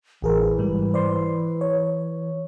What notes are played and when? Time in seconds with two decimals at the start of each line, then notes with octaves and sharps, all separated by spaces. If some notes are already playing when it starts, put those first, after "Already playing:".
0.22 A1 E3 G#4 A#4
0.59 G#2 G3
0.94 C5 D5 C6
1.61 C#5